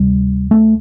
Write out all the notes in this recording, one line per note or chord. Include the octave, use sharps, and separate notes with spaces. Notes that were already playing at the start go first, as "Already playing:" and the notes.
Already playing: D2 C3 G3
A3